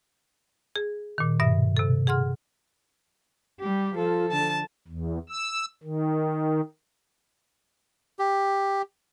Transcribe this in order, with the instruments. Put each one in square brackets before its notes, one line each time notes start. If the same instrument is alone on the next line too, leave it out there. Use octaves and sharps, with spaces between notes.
[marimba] G#4
A#2 D#3
G2 B2 E5
C3 A4
G#4 F#5 C6 F6
[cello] G3 G4
[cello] F3 A4 [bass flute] F4
[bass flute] D3 [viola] A5
[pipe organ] E2
E6
D#3
[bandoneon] G4